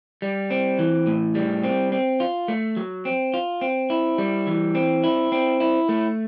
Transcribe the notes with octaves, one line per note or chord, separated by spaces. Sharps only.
G3
C4
E3
A2
G3
C4
C4
F4
A3
F#3
C4
F4
C4
E4
G3
E3
C4
E4
C4
E4
A3